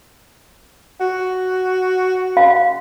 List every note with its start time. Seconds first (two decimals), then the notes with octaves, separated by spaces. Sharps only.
1.00 F#4
2.37 F5